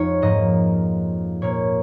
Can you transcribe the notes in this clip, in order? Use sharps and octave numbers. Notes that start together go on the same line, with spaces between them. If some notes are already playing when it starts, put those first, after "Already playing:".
Already playing: F2 G#3 D#4 F4 C#5
G#2 F3 A#3 D#5
A#2 A#3 C#5